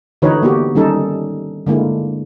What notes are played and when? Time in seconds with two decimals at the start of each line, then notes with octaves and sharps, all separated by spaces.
0.22 D3 E3 D#4 F#4 B4 C#5
0.42 A#3 B3 F#4 G4
0.75 D#3 G3 C#4 D#4 A4
1.66 D3 G#3 A#3 E4